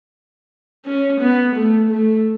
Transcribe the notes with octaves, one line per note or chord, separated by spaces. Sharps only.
C#4
B3
A3
A3